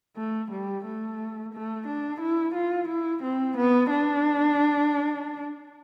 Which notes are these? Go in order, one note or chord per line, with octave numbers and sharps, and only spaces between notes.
A3
G3
A3
A3
D4
E4
F4
E4
C4
B3
D4